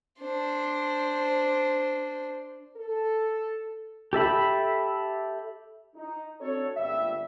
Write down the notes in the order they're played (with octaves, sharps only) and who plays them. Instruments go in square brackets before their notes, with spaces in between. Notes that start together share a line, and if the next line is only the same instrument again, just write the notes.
[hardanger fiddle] D4 C5
[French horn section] A4
[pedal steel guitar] G4 A4 E5 B5
[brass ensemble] D#4
C4 D4 F#4 A4 C#5
G1 C#2 G3 A#3 E5